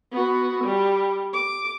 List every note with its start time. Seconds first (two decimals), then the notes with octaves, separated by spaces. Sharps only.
0.12 B3 F#4
0.64 G3
1.33 D6